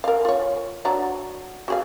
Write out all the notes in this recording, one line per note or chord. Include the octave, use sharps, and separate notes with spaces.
A#4 F5
F4 C#5
F#3 D4 A#5
F#4 G#4 F5